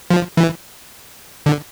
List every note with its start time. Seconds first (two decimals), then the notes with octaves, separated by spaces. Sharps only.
0.10 F3
0.37 E3
1.46 D3